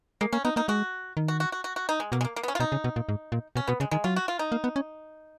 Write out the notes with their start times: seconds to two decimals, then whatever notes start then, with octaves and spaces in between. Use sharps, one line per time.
0.21 G#3 A#3
0.33 A#3 C#4
0.45 B3 D#4
0.56 A#3 D#4
0.68 G#3 F#4
1.17 D#3
1.28 F#4
1.40 F#4
1.52 F#4
1.64 F#4
1.76 F#4
1.89 D#4
2.00 G#3
2.12 B2 A#3
2.21 G#3
2.25 A#3
2.36 A#3
2.43 B3
2.48 C#4
2.55 F4
2.60 B2 D#4
2.72 C#3
2.84 B2
2.96 A#2
3.09 G#2
3.32 A#2
3.56 B2 C#4
3.67 B2 B3
3.80 C#3 G#3
3.91 D#3 G#3
4.04 F#3 F4
4.16 F#4
4.28 F4
4.39 D#4
4.52 A#3
4.64 B3
4.76 C#4